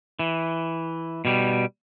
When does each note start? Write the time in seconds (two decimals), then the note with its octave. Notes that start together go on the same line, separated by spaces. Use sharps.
0.19 E3
1.25 B2 G3